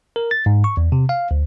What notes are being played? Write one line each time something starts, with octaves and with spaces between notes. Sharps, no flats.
A#4
A6
G#2
C#6
E2
C3
F5
D2